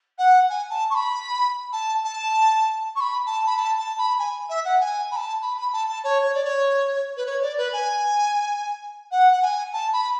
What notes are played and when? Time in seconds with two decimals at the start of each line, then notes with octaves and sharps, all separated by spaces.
0.18 F#5
0.49 G#5
0.70 A5
0.90 C#6
0.95 B5
1.72 A5
2.03 A5
2.95 C#6
3.00 B5
3.26 A5
3.46 B5
3.57 A5
3.78 A5
3.98 B5
4.19 G#5
4.49 E5
4.65 F#5
4.80 G#5
5.11 B5
5.16 A5
5.42 B5
5.57 B5
5.72 A5
5.88 A5
6.04 C#5
6.24 C#5
6.34 D5
6.44 C#5
7.17 B4
7.26 C#5
7.42 D5
7.57 B4
7.72 G#5
9.11 F#5
9.32 F#5
9.42 G#5
9.73 A5
9.93 B5